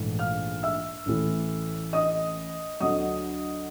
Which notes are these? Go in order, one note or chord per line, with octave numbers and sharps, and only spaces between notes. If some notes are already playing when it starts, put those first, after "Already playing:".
Already playing: A#1 G#2 E3 A3
F5 F6
E5 E6
A1 A2 E3 A3
D#5 D#6
D2 D3 F#3 D#5 D#6